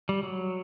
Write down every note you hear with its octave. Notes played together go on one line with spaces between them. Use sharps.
G3
F#3